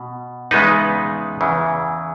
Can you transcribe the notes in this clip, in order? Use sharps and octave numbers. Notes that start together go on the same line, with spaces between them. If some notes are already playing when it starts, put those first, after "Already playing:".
Already playing: B2
E2 C#3 G#3 B3 D#4 B4
E2 C#3 E3